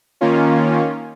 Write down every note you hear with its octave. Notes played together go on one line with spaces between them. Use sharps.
D#3 A#3 C#4 F4